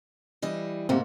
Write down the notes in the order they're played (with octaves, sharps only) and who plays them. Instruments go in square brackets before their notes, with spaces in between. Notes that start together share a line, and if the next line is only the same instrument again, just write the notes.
[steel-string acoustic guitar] E3 G3 D#5
[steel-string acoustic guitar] G#2 A3 A#3 [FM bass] C3